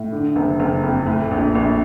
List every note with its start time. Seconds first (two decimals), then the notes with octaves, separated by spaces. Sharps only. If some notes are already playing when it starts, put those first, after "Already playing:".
Already playing: A2
0.12 D3
0.36 F#1
0.60 F#1
0.83 F2
1.07 A2
1.31 A#1
1.55 A#1